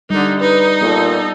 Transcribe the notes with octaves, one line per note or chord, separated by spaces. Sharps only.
D3 G3 D#4
D#4 B4
A#2 B3 A4